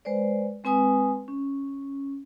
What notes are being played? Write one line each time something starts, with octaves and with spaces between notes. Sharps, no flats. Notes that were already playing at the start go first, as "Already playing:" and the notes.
G#3 B4 C5 D5
G#3 C4 B4 G#5 D#6
C#4